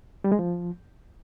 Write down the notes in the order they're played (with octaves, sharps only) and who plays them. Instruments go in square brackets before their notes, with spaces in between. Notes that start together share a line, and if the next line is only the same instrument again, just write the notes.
[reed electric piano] G3
G#3
F3